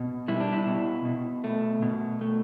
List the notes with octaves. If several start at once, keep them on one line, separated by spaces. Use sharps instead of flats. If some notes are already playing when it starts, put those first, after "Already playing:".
Already playing: B2
G3 E4
D4
E4
B2
B2
A3
B2
A3